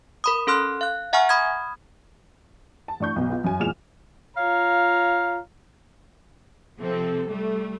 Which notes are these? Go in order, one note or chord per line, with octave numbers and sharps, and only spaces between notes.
A#4 B5 D#6
C#4 A4 C6 F6 F#6
F5 F#6
E5 F#5 G#5 A#5 C#6 F6
B5 D#6 F6 G#6
A5
A2 D4 C#6 G6
B1 B2
B3 F4
F#2 G#5
E2 A#2 G#3 F6 E7 F7
F4 C#5 F5 A#5
C3 F3 C4 A4
G3 A3